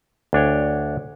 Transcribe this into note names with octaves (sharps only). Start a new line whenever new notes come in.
D2 D4 C#5 G5